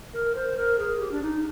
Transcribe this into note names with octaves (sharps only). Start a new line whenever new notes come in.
A#4
C5
A#4
G#4
G4
D4
D#4